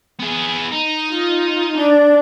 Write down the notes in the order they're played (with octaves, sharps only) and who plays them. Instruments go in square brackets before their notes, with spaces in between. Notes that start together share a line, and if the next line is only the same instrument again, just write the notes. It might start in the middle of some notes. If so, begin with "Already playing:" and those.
[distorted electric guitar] B3 G#4
D#4
[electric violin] F4
[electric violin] D4 [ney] D5